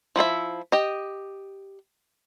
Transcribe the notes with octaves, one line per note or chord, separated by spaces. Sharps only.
F3 E4 G#4 E5
G4 D#5